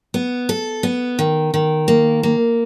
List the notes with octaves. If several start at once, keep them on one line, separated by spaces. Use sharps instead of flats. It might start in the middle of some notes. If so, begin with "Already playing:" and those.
B3
A4
B3
D#3
D#3
A#3
A#3